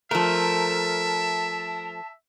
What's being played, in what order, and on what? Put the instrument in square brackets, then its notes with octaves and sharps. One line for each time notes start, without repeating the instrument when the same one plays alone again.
[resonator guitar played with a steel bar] F3 A3 [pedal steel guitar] A#4 [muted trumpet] E5 [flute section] A5